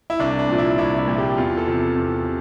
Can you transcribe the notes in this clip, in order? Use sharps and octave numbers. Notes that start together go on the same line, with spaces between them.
E4
C2 D4
D4
A#2 F3
E4
C2 E4
E4
A#2 F3
G4
E2 F4
A4
C3 F3
E2
C3